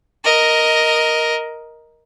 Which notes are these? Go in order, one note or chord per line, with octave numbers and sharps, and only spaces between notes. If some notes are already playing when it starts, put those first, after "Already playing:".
A#4 D#5